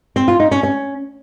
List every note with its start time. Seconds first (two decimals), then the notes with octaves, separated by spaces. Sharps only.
0.16 C4
0.28 F4
0.40 D#4
0.51 C#4
0.63 C#4